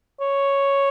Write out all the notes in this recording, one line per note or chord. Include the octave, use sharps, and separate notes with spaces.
C#5